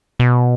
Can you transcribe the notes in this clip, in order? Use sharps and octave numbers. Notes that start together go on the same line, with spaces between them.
B2